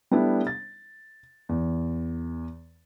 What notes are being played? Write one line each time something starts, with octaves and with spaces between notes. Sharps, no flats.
G3 A3 B3 D4 E4
A6
E2